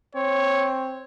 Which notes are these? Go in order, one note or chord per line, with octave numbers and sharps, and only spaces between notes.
C4 C#5